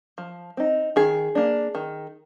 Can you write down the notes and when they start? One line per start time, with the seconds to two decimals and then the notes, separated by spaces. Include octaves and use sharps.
0.18 F3
0.57 C4 D#4
0.96 D#3 G#4
1.35 A#3 D4
1.75 D#3